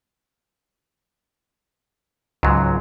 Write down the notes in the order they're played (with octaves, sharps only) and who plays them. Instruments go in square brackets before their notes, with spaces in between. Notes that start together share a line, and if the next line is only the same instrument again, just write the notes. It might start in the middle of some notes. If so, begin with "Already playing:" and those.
[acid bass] C#2 [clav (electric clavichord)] G#2 F#3